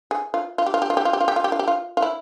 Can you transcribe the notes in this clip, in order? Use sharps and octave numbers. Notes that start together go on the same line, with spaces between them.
G#4
F4
F4
G4
F4
G4
F4
G4
F4
G4
F4
G4
F4
G4
F4
G4
F4
F4
E4